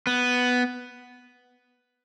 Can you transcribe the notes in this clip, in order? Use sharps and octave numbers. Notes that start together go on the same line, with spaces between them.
B3